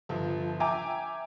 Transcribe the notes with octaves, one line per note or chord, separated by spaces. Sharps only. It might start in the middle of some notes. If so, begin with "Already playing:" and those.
G1 F3
E5 G5 G#5 A#5 D6